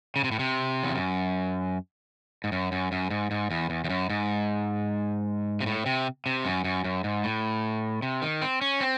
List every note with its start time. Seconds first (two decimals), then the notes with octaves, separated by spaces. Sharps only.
0.16 C#3
0.24 C3
0.32 A2
0.39 C3
0.83 E2
0.95 F#2
2.44 G#2
2.52 F#2
2.72 F#2
2.92 F#2
3.10 G#2
3.31 G#2
3.51 E2
3.70 E2
3.84 E2
3.90 F#2
4.10 G#2
5.60 C3
5.66 A2
5.86 C3
6.26 C3
6.45 F#2
6.64 F#2
6.84 F#2
7.04 G#2
7.24 A2
8.02 C3
8.22 D#3
8.42 C4
8.61 C#4
8.81 C4